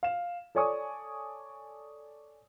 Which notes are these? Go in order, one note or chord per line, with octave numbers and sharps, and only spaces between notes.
F5 E7
A4 C#5 D5 G#5 C#6 D#6